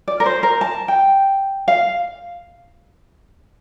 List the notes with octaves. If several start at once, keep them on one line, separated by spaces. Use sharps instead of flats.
D5
A#4
C5
A#4
A5
G5
F5